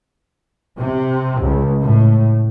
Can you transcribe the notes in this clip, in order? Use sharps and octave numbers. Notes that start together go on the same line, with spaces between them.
C3
C#2
A2